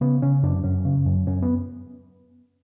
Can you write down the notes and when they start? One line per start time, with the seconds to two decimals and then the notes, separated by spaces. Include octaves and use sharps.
0.01 C#3 B3
0.22 C#3 C#4
0.43 F#2 D4
0.64 F#2 C#4
0.85 C#3
1.06 F#2
1.27 F#2 C#4
1.42 B3